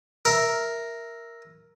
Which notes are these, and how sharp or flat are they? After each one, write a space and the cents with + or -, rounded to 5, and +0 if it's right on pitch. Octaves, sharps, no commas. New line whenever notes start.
A#4 +0 E5 +0